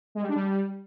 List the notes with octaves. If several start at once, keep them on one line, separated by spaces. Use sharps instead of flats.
G#3
G3
D4
G3